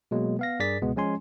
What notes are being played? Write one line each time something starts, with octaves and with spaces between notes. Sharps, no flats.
B2 F#3 G#3 A#3
B3 F5 A#6
G2 G#4 A#4 D5 A6 B6
C#2 B2 G#3 B3
F3 G#3 C#4 G#5 C6